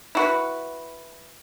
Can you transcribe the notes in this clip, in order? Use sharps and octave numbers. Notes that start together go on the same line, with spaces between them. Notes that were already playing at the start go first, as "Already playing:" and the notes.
E4 F#4 B4